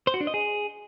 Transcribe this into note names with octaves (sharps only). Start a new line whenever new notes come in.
C5
F#4
D4
D#5
G#4